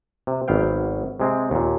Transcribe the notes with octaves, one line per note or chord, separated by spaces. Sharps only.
C3
G#1 F#3 B3 F5 G5
C3 G#3 C4
D#2 A#2